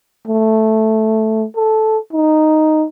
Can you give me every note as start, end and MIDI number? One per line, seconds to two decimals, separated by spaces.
0.27 1.46 57
1.56 1.98 69
2.13 2.86 63